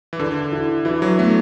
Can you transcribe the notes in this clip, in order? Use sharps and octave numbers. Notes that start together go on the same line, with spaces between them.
E3
D3 A4
E4
E3 E4
F#3
A3 B3